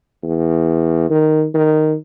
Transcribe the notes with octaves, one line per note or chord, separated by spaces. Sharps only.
E2
D#3
D#3